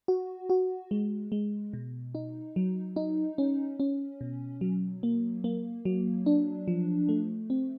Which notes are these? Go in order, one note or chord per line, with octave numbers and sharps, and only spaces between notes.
F#4
F#4
G#3
G#3
B2
D#4
F#3
D#4
C#4
C#4
B2
F#3
A#3
A#3
F#3
D4
F3
A3
C4